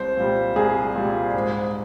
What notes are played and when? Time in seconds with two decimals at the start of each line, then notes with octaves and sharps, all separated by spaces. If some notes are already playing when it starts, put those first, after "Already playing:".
Already playing: C2 C5
0.17 A#2 G3
0.56 C2 G#4
0.96 A#2 G3
1.34 G#2